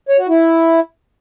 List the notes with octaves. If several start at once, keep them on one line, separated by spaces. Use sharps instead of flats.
C#5
F#4
E4